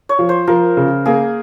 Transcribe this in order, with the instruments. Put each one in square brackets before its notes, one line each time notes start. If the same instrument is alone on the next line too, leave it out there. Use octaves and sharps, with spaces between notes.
[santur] C#5
[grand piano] F3
[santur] C5
[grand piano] F3 [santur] A#4
[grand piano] C#3
[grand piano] A#3 [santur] G#4